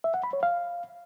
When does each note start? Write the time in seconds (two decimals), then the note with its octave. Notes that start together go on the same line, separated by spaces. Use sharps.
0.04 E5
0.14 F#5
0.24 B5
0.33 C#5
0.43 F5